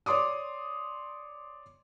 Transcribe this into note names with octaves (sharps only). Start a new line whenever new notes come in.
C#5 D5 C6 D6 D#6